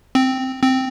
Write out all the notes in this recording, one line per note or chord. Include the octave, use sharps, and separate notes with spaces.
C4
C4